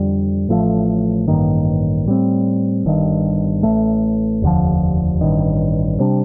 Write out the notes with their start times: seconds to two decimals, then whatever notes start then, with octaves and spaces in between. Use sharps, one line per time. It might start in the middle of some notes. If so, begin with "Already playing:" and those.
Already playing: F2 D3 G3
0.49 A1 A2 F3 A3
1.28 A1 G2 D#3 A#3
2.06 A2 G3 C4
2.85 G1 G2 D#3
3.63 A1 A2 A3
4.42 F1 D#2 D3 F3
5.21 A1 G2 D#3
6.00 C3 G3 D4